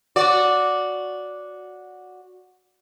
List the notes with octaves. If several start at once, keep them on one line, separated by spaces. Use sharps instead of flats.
F#4 D5